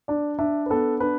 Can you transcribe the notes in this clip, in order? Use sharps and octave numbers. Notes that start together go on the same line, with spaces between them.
D4 D5
D4 E5
B4
B3 A4
D4 B4